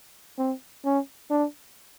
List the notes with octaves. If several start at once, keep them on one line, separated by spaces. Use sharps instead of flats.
C4
C#4
D4